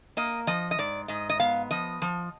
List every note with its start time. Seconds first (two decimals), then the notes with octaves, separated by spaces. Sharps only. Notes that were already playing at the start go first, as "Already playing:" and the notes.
0.17 A#3 D#5
0.47 F3 D#5
0.71 D#5
0.78 G#2 D5
1.08 G#2 D#5
1.30 D#5
1.40 B3 F5
1.71 F3 D#5
2.02 F3